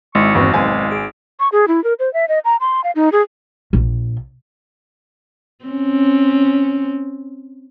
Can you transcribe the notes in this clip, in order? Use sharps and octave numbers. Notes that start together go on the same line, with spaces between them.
G#1 G#3 E4 C#6
E2 G2 C4 F#4
B1 G#3 C4 F5 G#5
G#4 D7
C#6
G#4
E4
A#4
C5
E5
D#5
A#5
C6
F5
D#4
G#4
A#1
C4 C#4